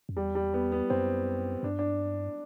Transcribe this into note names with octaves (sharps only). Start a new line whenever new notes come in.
F#2
E2 G3
G3
B3
B3
F#2 C4
G2 D4
D4